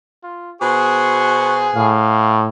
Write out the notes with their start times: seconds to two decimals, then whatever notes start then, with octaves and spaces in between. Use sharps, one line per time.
0.24 F4
0.62 B2 G#4 C5 C#6
1.76 A2 F5